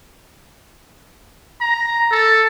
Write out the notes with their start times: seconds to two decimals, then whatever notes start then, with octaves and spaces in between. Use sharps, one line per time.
1.61 A#5
2.11 A4